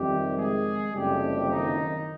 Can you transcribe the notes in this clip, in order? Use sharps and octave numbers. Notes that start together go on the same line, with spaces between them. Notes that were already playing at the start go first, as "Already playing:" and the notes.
Already playing: F2 C3 D#3 G3 G4
G#3 G#4
F#1 F2 C3 G3 G4
D#3 D#4